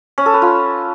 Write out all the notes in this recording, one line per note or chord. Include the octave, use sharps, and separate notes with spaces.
C#4
A4
B4
F4